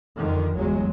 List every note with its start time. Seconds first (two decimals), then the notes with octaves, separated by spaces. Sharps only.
0.17 F2 D3 D#3
0.55 G1 E2 F#3 G#3